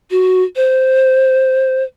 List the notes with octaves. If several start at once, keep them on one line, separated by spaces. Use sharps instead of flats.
F#4
C5